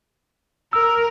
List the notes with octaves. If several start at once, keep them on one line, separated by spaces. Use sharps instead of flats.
A#4 E6